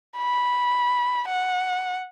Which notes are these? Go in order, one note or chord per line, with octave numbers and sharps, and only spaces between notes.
B5
F#5